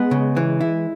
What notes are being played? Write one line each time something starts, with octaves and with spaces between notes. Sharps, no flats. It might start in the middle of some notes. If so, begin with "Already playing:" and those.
Already playing: G#3 B3
C#3
E3
E4